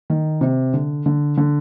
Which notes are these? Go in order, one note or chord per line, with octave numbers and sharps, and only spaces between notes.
D#3
C3
D3
D3
D3